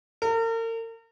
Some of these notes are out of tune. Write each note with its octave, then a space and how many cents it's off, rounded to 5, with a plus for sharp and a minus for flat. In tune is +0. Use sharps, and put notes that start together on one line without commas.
A#4 -40